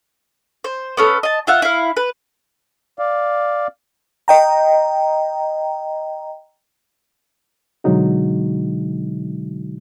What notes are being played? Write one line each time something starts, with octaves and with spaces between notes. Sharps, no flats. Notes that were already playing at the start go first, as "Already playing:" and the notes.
C5
B3 C#4 A4
D#5 A5
F4 E5 F#5
E4 F5
B4
D5 F5
D#5 G5 A#5
B2 D3 F#3 G#3 D#4 F#4